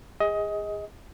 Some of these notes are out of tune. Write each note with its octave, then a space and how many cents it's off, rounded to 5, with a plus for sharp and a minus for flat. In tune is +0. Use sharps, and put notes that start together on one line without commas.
G#4 -25 D#5 +20